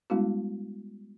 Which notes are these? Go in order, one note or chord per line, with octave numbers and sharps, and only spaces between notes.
G3 G#3 B3 C#4 E4 F#4